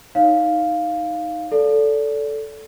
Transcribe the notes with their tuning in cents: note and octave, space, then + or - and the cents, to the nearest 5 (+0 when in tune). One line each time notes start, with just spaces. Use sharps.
D#4 +10 C#5 +0 F5 +0
A4 +0 D5 -30